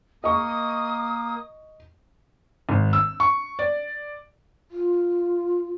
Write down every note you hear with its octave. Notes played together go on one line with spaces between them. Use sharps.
A#3 D#5 C#6 D#6
G#1
E6
C#6
D5
F4